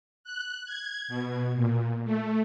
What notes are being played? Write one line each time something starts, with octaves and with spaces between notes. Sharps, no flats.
F#6
G#6
B2
A#2
A3